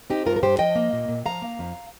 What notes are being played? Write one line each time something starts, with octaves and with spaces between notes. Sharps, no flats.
C4 D#4 G4
G2 F4 A#4
A#4
G2 G4 C5
F3 D#5 G5
A#3
A#2
A#2
F3 F5 A#5
A#3
F2